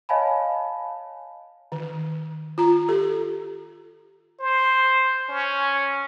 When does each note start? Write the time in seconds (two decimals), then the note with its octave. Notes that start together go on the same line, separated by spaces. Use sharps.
0.09 C#5 D#5 F5 G#5 A5 B5
1.72 D#3
2.58 F4 A#5
2.89 G4 A4
4.40 C5
5.29 C#4